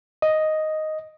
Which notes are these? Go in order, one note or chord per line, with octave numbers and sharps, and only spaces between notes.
D#5